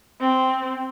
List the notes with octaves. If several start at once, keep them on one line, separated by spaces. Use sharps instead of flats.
C4